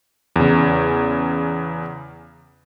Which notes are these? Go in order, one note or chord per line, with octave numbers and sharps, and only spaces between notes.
E2 C#3